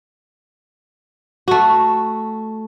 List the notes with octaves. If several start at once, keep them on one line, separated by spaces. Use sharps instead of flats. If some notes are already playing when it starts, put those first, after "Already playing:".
A3 F#4